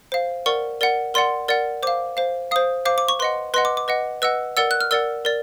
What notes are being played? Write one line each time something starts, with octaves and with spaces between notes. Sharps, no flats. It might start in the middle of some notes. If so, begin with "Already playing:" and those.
C5 F5
A#4 D5 F#5 C#6
A#4 D5 F#5
A#4 D5 F#5 C6
A#4 D5 F#5
C5 F5 D6
C5 F5
C5 F5 D#6
C5 F5 D6
D6
C#6
B4 D#5 F#5 C6
B4 D#5 F#5 C6
D6
D6
B4 D#5 F#5
B4 D#5 F#5 E6
A#4 D5 F#5 E6
F#6
F6
A#4 D5 F#5 E6
A#4 D5